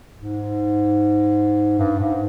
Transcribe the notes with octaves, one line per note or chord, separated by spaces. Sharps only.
G#2
G2
G#2